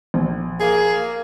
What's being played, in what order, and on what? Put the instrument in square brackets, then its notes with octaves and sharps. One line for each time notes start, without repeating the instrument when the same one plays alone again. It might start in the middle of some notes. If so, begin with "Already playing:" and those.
[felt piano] A#1
[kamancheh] A#3 [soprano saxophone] G#4